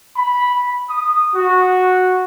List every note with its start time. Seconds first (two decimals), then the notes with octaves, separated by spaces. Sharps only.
0.17 B5
0.90 D#6
1.36 F#4